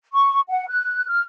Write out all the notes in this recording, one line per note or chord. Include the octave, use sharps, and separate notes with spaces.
C#6
F#5
F#6
F6